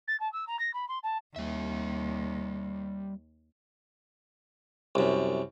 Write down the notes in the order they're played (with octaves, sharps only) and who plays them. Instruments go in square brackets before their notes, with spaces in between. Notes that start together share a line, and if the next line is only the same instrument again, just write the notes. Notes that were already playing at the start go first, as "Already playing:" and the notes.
[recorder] A6
A5
E6
A#5
A#6
B5
C6
A5
[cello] D#2 [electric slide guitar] G3 E5
[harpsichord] C2 F#2